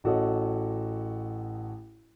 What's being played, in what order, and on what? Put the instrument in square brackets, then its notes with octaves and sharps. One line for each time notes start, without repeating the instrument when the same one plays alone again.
[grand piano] A1 F#4 A4 C#5 D#5